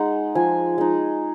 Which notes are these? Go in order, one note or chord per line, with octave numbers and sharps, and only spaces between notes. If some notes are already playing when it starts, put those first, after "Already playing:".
Already playing: G#3 D#4 F#5
F3 G#5
G#3 D#4